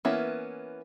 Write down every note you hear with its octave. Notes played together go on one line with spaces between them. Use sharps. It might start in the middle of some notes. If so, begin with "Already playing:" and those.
E3 A#3 B3 C#4 E4